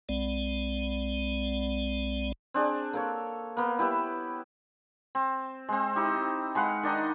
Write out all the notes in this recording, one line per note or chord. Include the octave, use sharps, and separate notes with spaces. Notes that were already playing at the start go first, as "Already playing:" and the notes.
B1 G#3 C4 D5
C4 D4 G#4
A#3 A4 C#5
A#3 B3
E4 G4 B4 E5
C4
G#3 C4
D#4 E4 G4
G#3 B4 F5 F#5
D#3 D4 D#4 D#5